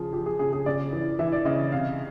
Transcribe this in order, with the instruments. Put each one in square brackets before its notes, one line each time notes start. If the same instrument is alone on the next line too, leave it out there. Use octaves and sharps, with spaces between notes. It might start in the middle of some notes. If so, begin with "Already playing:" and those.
Already playing: [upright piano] C#3 F3 G#4
F3 G4
G#4
C#3 G#4
G#4
C#3 D5
E3
E3 E5
D5
C#3 D#5
C3 F5